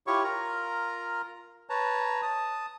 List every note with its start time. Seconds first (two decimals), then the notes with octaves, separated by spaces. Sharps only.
0.07 E4 F4 G4 C#5 C#6
0.24 F4 A#4 A#5
1.70 B4 C#5 A5 A#5
2.22 A5 D#6